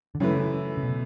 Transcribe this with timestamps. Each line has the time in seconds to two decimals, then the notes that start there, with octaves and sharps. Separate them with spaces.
0.15 D3
0.20 F#2 C#3 E3 A3 E4 B4
0.77 C#3
0.83 B2